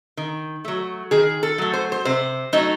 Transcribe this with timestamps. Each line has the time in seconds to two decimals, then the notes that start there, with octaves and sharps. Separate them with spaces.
0.17 D#3
0.65 F#3 A3
1.11 D#3 G#4
1.43 A4
1.58 F#3 A3
1.74 C5
1.92 C5
2.05 C3 C5
2.53 F#3 A3 D#4